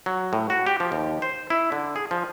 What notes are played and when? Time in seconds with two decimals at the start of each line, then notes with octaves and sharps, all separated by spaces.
0.06 F#3
0.33 A2
0.50 F#4
0.66 G4
0.80 F3
0.92 D#2
1.22 C5
1.50 E4
1.72 D3
1.96 G#4
2.11 F3